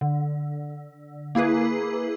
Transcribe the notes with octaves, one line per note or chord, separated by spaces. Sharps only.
D3
A#3 E4 G#4 B4